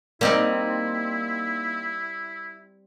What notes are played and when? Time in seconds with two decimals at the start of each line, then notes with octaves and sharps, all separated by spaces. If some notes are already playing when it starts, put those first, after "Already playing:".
0.21 G3 A#3 C4 D#4 E4